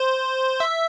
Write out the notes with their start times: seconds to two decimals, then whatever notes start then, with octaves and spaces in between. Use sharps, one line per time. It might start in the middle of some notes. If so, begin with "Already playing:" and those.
Already playing: C5
0.60 E5